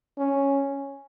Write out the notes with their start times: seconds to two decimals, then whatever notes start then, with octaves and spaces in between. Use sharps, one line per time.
0.18 C#4